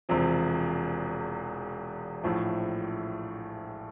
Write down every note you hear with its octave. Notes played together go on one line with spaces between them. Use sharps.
E1 E2 C3 F3
A#1 A2 F3 A3